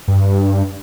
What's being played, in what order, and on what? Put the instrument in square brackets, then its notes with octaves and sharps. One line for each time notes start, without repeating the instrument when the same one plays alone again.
[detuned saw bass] G2